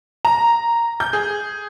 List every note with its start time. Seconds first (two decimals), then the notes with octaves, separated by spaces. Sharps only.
0.25 A#5
1.00 G6
1.13 G#4